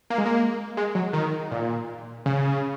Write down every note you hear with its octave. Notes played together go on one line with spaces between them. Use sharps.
A#3
G#3
A#3
G#3
F#3
D#3
A#2
C#3